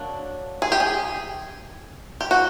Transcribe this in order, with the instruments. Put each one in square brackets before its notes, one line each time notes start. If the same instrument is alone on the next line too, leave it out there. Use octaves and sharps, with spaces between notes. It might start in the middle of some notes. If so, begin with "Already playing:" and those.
Already playing: [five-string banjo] F#3 A#3 D4
G#4
G4
G#4
G4
F#4